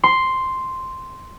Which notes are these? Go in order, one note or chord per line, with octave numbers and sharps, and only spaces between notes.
C6